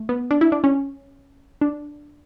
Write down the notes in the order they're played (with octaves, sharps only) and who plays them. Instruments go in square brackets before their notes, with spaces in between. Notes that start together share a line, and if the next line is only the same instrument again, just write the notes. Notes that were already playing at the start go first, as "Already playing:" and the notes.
Already playing: [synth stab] A3
B3
D4
E4
D4
C#4
D4